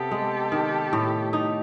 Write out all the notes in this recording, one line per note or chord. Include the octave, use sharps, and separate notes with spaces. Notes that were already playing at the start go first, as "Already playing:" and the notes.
Already playing: C3 B3 G4 A4
G#3
D#3
A2
D#4